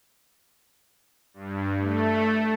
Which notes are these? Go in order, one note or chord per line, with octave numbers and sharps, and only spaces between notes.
G2
A3